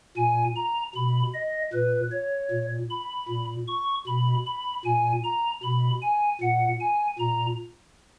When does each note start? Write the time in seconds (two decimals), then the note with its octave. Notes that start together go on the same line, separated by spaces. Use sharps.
0.17 A#2 G#5
0.56 A#5
0.95 B2 B5
1.34 D#5
1.73 A#2 B4
2.12 C#5
2.51 A#2
2.90 B5
3.29 A#2
3.68 C#6
4.07 B2 B5
4.46 B5
4.85 A#2 G#5
5.24 A#5
5.63 B2 B5
6.02 G#5
6.41 A#2 F#5
6.80 G#5
7.19 A#2 A#5